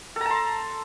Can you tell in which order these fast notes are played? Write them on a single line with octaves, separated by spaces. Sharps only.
A4 A#5 A5 C6